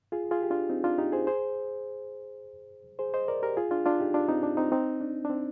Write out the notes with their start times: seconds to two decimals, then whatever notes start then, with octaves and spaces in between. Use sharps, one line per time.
0.12 F4 G#4
0.31 F4 G#4
0.42 G4
0.50 D4 F4
0.70 C4 D#4
0.84 D4 F4
0.98 D#4 G4
1.12 G#4 C5
1.27 G#4 C5
2.99 G#4 C5
3.14 C5 D#5
3.28 A#4 D5
3.43 G4 A#4
3.57 F4 G#4
3.71 D4 F4
3.86 D4 F4
4.00 D#4 G4
4.14 D4 F4
4.29 C4 D#4
4.43 D4
4.57 C4 D#4
4.72 C4 D#4
5.01 D4
5.25 D4
5.30 C4